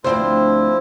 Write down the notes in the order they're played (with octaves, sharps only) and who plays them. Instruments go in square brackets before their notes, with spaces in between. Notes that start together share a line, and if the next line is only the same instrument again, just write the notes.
[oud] D2 C4 D4 [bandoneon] F3 E4 F4 [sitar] C5